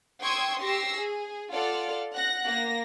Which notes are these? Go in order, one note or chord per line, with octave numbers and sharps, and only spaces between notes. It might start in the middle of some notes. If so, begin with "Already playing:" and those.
G5 C6 C#6 D#6 E6 G#6
G4 C#6 E6 A#6 C7
G#4
F4 A4 D5 F#5 F6
F#5 F#6 A#6
A#3 A#6